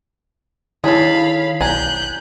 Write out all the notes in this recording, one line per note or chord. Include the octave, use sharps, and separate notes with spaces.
D#3 E4 G#4 A4 C#5 F5 B5
B1 G#5 A#5 F#6 G6